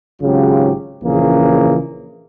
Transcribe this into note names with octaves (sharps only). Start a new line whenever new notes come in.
G#1 G#2 C#3 F#3 F4 G4
A#1 C#3 E3 A#3 C#4 G#4